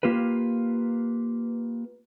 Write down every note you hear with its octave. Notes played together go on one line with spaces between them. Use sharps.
A#3 F4 G4 B4